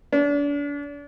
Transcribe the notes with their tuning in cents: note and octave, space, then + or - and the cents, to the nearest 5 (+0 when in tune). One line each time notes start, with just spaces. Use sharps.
D4 -35